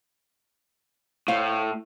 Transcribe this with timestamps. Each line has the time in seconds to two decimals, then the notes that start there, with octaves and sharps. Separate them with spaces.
1.28 A2 C5 F5